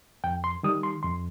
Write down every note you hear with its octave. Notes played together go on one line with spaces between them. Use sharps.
F2 G5
C6
D#3 G3 D#6
C6
F2 C6